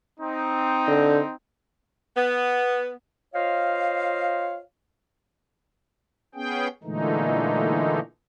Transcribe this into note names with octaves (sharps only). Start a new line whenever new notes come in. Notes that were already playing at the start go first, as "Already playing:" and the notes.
C4 D#4
D3
B3
F4 C5 C#5 D#5 F5
B3 C#4 G#4 G5
A#2 D3 E3 G#3 A3 D#4